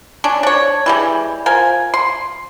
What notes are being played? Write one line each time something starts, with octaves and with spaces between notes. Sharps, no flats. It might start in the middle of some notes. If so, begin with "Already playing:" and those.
C#4 D4
D4 C#5
E3 G3 G#3
F3 A#4 G#5
C6